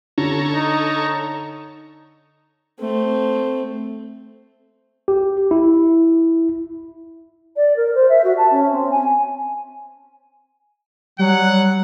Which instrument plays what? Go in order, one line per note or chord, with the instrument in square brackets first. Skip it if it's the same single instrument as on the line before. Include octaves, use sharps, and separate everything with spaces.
[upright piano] D3 [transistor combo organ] A4 C#5 A#5
[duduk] D#4
[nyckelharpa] A3 C4
[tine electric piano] G4
E4
[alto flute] D5
A#4
C5
E5
F#4
A5
C#4
C4
G#5
[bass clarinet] F#3 [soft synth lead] G3 [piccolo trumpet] F#5